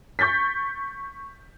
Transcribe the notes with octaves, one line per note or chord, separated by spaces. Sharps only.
C#6 G6 A6 B6